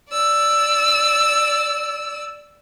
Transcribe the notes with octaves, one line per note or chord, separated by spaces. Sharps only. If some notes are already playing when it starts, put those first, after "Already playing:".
D5 E6